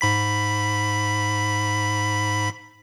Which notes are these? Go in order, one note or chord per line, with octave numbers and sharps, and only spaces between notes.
G#2 B5 B6